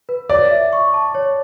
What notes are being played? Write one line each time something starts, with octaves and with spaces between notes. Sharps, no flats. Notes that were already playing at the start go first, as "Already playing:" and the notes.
B4
C#5 D5
E5
C#6
A5
C#5